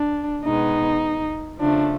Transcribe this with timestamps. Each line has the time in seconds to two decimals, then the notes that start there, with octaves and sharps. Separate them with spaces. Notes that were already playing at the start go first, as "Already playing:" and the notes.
Already playing: D4
0.44 B2 G#3 B3 D#4
1.59 C#3 F3 A3 D4